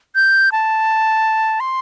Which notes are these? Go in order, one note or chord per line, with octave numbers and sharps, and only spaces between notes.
G6
A5
C6